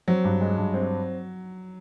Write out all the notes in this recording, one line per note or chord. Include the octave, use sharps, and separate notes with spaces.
F#3 C4
G2
G#3
G2
C4